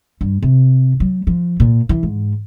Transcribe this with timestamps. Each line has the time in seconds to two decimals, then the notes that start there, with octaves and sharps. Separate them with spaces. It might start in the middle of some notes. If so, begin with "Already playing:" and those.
0.21 G2
0.43 C3
1.00 F#3
1.27 F3
1.60 A#2
1.89 E3
2.03 G#2